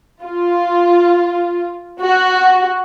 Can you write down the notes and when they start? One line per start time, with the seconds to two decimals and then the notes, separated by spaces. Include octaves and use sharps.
0.23 F4
2.00 F#4